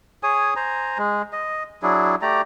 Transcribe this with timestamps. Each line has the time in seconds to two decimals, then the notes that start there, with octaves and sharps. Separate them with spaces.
0.23 G#4 C#5 G#5 D#6
0.56 C5 G#5 A#5
0.98 G#3
1.33 D#5
1.83 F#3 D4 E4 G#4
2.22 A3 G4 D5 A#5